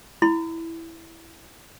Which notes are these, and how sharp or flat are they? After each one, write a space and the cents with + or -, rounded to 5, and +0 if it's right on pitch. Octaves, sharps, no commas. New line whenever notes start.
E4 +0 B5 +45